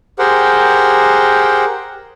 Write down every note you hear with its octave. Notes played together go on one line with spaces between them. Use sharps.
G4 G#4 A#4 C5 F#5 G5